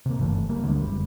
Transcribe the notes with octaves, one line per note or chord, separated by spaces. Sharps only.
C3 A#3
G1 C#3 E3 A3
C#3 F#3 G3 A#3
D2 D3 G3 G#3
F#1 F2 G3